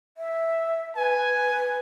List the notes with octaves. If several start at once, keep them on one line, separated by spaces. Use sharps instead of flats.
E5
B4 G#5